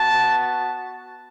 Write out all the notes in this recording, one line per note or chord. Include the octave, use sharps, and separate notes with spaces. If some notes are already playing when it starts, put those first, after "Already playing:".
Already playing: B3 F#4 A5